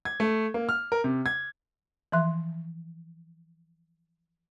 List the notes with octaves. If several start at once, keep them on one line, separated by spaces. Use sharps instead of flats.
G#6
A3
A#3
F6
A#4
C3
G#6
E3 F3 E5 C6 F#6